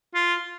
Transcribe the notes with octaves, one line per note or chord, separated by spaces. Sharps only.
F4